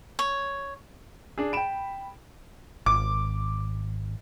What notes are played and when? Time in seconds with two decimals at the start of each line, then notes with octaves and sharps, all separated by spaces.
0.19 C#5
1.38 D4 G#4
1.53 G5 B5 D7 E7
2.86 G#1 D6